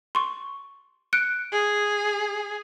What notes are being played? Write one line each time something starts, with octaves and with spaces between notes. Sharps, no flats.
C6 C#6
F#6 C#7 D7
G#4